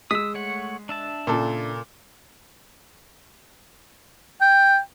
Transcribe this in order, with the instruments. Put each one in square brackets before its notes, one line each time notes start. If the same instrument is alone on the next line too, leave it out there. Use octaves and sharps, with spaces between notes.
[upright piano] G#3 B6 [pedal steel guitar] D#6 E6
[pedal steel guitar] A3 C#5 F#5
D4 E5 A5
[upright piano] A#2 C#3 A4
[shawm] G5